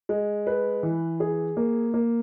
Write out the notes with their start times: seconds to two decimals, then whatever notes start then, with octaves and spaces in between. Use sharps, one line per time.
0.09 G#3
0.47 B4
0.83 E3
1.20 G#4
1.57 A#3
1.94 A#3